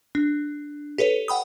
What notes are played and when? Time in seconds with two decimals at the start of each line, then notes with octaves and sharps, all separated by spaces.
0.15 D4
0.98 G4 A4 B4 C#5
1.28 F#5 G5 B5 D#6